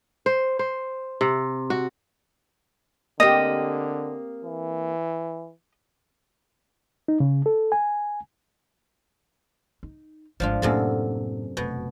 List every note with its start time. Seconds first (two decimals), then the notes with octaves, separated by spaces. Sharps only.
0.26 C5
0.59 C5
1.21 C3
1.70 F#4
3.20 D3 A#3 C4 G4 D#5
4.45 E3
7.08 D#4
7.20 C#3
7.46 A4
7.72 G#5
9.83 D#4
10.40 G#1 F3 G#3 D4 F4
10.62 F#2 A2 C3 A#3 A4
11.57 F1 B2